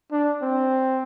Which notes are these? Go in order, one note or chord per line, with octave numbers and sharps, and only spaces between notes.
D4
C4